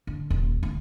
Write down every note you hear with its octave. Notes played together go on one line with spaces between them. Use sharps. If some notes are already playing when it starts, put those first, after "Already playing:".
D3
D#1
D2